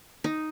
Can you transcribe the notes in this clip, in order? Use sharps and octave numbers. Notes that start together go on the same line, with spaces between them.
D#4